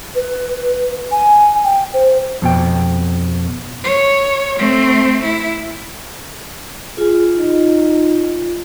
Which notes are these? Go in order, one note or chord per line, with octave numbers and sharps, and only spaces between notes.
B4
G#5
G5
C5
F2 B2 G5
C#5
A3 C4
E4
F4 G#4
D#4